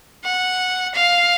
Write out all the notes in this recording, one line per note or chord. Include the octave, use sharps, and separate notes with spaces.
F#5
F5